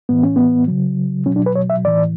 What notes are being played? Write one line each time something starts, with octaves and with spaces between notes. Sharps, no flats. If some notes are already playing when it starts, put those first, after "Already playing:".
A2 E3 B3
C#4
B3
C#3 F#3
B2 F#3 C#4
D4
B4
C#5
E5
A2 E3 D5